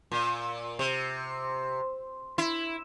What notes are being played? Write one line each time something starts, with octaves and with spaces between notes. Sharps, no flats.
A#2
C3
E4